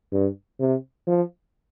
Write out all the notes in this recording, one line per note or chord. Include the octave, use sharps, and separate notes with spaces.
G2
C3
F3